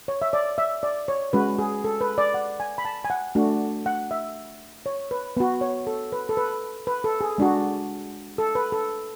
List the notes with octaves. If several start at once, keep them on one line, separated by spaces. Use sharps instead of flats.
C#5
E5
D5
E5
D5
C#5
G#3 C#4 F#4 B4
G#4
A4
B4
D5
F#5
G#5
B5
A5
G#5
F#5
A3 D4 F#4
F#5
E5
C#5
B4
B3 F#4 B4
C#5
A4
B4
A4
B4
B4
A4
G#4
G#3 D4 F#4
A4
B4
A4